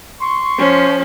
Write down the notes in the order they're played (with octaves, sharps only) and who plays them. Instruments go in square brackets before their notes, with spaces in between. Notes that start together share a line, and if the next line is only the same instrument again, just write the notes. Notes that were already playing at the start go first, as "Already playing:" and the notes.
[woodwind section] C6 C#6
[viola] F3 C#4